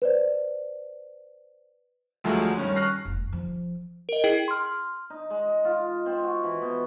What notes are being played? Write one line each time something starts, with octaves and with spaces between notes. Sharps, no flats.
B4 C5 D5
D2 F3 F#3 G#3 A3
G2 D#3 C#4
C#6 F6 F#6 A#6 C7
F1
F3
A#4 D#5
E4 G#4 G5
C6 F6
D#4
G#3
F4
C4
F#4
E3
B2